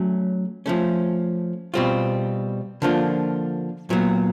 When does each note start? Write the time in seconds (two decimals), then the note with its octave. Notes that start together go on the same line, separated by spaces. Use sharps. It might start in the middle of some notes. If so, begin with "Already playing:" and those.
Already playing: F#3 A3 C#4
0.66 F3 A3 C#4
1.74 B2 G3 C4 F4
2.82 D3 F3 A#3 D4 F4
3.90 A#2 F#3 B3